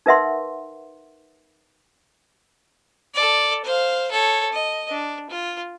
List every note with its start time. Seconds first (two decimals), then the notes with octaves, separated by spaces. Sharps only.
0.06 D#4 A#4 B4 E5 F#5 C6
3.14 A4 D5
3.65 C5 F5
4.11 A4 C#5
4.53 D#5
4.90 D4
5.30 F4